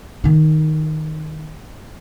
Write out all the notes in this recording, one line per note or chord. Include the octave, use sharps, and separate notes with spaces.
D#3 D#4